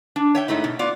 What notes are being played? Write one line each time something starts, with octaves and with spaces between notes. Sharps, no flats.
D4
C#5 E5 G5
G#2 A3 D#4 E4
B2
B3 F4 D5